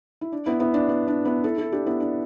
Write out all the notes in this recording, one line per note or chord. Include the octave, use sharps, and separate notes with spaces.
E4
D4
B3 E4
B3 E4
D4
B3
D4
B3 E4
E4 A4
E4 A4
D4 G4
B3 E4
D4